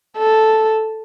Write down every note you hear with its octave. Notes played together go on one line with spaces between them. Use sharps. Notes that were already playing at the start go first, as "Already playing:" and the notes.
A4